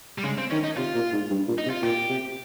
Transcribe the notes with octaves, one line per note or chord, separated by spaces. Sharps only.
G3
C#3 G#3
C4
D#3 C#4
D#4
C3 F4
A#2
G#2
G2
A#2
D#4
C3
F4
A#2 G4
C3